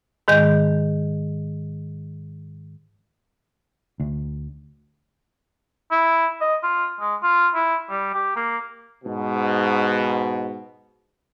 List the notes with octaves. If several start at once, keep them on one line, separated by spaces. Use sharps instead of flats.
G#2 D#3 G#3 G6
D2
E4
D#5
F4
G#3
F4
E4
G3
G4
A#3
G#2 B2